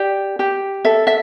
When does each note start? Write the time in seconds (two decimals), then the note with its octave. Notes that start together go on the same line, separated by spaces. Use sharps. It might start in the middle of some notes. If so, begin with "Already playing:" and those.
Already playing: G4 D5
0.39 G4
0.85 A4 E5
1.07 E5